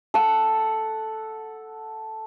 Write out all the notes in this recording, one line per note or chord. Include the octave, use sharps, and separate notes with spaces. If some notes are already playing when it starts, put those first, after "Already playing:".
A4 F#5